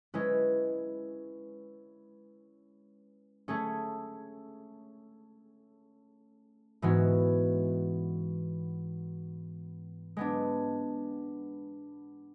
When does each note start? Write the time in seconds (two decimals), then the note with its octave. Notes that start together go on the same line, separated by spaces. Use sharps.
0.14 G#3 C#4 E4 B4
3.48 A3 C#4 G#4
6.82 G#2 E3 G#3 B3 F#4
10.17 G#3 B3 D4